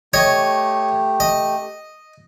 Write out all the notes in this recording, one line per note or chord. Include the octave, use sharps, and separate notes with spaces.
A3 G4 C#5 D#5
D#5